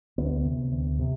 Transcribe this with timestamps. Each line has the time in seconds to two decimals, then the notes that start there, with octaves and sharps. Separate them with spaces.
0.18 D2 B3
0.45 C3
0.72 D2
0.99 C3